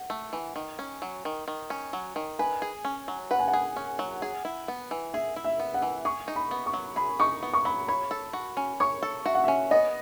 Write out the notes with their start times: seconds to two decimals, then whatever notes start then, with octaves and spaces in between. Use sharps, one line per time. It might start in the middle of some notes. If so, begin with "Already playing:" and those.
Already playing: F#5
0.10 A3
0.33 E3
0.56 D#3
0.79 C#4
1.02 F#3
1.25 D#3
1.48 D#3
1.70 C#4
1.93 F#3
2.16 D#3
2.39 B4 G#5
2.62 G#4
2.85 C#4
3.08 F#3
3.31 B4 F#5
3.39 G#5
3.48 F#5
3.53 G#4
3.76 C#4
3.99 F#3
4.22 G#4
4.45 E4
4.68 B3
4.91 E3
5.14 G#4 E5
5.36 E4
5.44 E5
5.60 B3
5.74 F#5
5.82 E3
6.05 G#4 C#6
6.28 D#4
6.36 B5
6.51 B3
6.66 C#6
6.73 F#3
6.96 G#4 B5
7.19 D#4 C#6
7.43 B3
7.53 C#6
7.65 F#3 B5
7.88 C#5 B5
8.11 A4
8.33 F#4
8.57 C#4
8.80 C#5 C#6
9.03 A4
9.26 F#4 E5
9.35 F#5
9.44 C#4 E5
9.71 B3 D#5